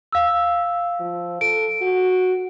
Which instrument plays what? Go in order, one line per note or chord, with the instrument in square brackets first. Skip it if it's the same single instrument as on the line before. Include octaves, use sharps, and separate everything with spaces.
[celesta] F5 E6
[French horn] F3
[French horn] A4 [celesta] D7
[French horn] F#4